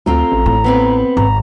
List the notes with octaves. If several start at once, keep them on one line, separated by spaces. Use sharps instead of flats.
D2 A3 C4 F4 A#5
A1
A2
B3 C4 B4
G#1 A#5